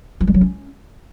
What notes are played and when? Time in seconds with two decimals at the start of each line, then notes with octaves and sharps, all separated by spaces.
0.21 F3
0.27 G3
0.34 F#3
0.41 C#4